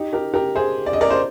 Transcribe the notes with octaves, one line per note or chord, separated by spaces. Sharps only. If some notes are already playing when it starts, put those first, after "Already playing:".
Already playing: D#4 G4
G4 A#4
G4 A#4
G#4 C5
D5
D#5
A#4 D5
C5